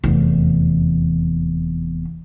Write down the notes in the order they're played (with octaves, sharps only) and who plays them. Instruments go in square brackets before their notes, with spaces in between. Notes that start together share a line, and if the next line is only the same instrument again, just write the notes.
[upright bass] F1 E2